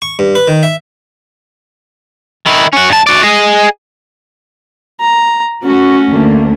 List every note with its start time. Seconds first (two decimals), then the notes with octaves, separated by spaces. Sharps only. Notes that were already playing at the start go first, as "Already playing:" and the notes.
0.02 C#6
0.19 G2
0.35 B4
0.48 D#3
0.63 E5
2.46 D#3 E4
2.73 C#4 F#4
2.89 G2 A5
3.07 F#4 D5
3.23 G#4 D#5
5.00 A#5
5.64 A3 C#4 F#4
6.08 D2 A3 A#3